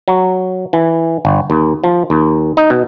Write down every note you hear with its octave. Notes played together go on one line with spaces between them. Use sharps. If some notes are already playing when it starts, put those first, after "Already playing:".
F#3
E3
G1
D#2
F3
D#2
D#4
B2